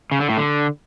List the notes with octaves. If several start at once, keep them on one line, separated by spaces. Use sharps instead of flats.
C#3
D3
A2
D3